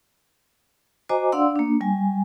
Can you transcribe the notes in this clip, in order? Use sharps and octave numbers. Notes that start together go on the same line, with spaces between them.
F#4 C5 D#5 G#5 A#5 D6
D4 D5 F5 F#5 C6 E6
A#3 D4
G3 G#5